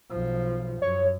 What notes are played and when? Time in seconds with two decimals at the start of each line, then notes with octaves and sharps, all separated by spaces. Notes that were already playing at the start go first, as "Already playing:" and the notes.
0.10 B1 F3
0.82 F#2 C#5